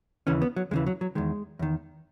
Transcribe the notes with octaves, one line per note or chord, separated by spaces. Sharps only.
D#2 C#3 E3 C#4
B3
F#3
D#2 C#3 E3 G#3
F#3
F#3
E2 D#3 G#3
E2 D#3